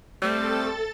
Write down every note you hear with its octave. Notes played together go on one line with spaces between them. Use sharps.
G3 A3 C4 A4 A6